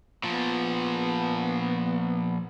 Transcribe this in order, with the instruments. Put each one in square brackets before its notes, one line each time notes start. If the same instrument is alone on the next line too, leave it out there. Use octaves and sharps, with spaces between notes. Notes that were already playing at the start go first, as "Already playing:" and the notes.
[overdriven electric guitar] A#2 F3 [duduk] B3